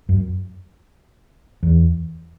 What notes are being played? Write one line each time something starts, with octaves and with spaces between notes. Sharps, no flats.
F#2
E2